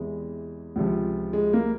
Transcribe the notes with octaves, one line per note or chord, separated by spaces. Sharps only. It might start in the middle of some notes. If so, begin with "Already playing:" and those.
Already playing: E2 C3 E3 G#3
C#2 C3 F3
G#3
A#3